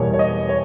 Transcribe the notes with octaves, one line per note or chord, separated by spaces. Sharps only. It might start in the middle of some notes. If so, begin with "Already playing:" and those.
Already playing: E2 B2 G3 A#3 C#5
C#5
D#5
C#5